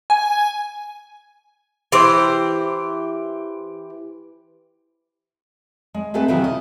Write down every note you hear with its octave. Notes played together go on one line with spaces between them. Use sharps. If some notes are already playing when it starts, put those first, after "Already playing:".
G#5
E3 G4 C5
G#3
A3 B3 C4 G#4 A4 B4
C3 D#3 E3 F#3 E4 F4
D#5